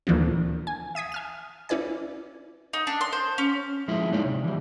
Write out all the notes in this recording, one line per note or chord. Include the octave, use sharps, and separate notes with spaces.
D2 A#2 D3 E3 F3 C4
G#5
E5 D#6 G#6 B6
G#5 F6 E7
C#4 E4 B4 D5 G#5
D#4
D4
C6
C5
C#4
F3 G#3 E4
G#3 D#4 C#5 D5
C3
E3 G3